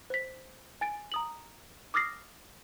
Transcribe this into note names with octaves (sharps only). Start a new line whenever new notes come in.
C5 B6
G#5 A6 D7
A#5 D#6 F#7
D6 D#6 F6 A6 A#6 C7